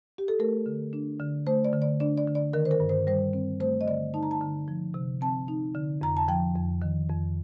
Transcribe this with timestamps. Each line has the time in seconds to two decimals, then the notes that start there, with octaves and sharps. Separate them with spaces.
0.18 G4
0.28 A4
0.39 A3 A#4
0.66 D3
0.93 D4
1.20 D3
1.47 A3 C5
1.65 D5
1.73 D3
1.82 D5
2.00 D4 D5
2.17 D5
2.27 D3
2.35 D5
2.53 D#3 A#4
2.65 C5
2.71 A#4
2.80 G2
2.89 C5
3.07 G3 C5
3.33 C4
3.60 A3 C5
3.81 D#5
3.87 D3 D5
4.14 D#4 A5
4.23 A#5
4.31 A5
4.41 D3
4.68 F3
4.94 C3
5.21 C4 A5
5.48 D#4
5.75 D3
6.01 F2 A#5
6.17 A5
6.28 F3 G5
6.55 F2
6.82 D#3
7.09 F2